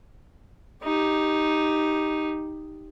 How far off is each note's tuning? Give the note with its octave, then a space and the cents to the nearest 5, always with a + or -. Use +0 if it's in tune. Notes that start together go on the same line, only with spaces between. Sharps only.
D#4 +0 G4 +0